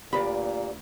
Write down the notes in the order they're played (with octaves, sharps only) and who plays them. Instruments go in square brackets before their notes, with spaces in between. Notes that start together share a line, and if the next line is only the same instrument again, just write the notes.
[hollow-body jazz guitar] D2 B5 [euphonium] A#2 [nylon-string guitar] G4 B4 D5